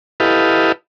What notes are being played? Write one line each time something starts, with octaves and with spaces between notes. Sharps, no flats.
E4 G4 A4 B4 D#5 F5